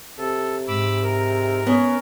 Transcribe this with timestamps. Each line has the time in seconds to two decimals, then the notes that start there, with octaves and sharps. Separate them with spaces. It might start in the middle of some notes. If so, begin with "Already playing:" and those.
0.18 C3 A4
0.68 G#2 B5 D6 E6
1.03 A#4
1.67 B3 C#4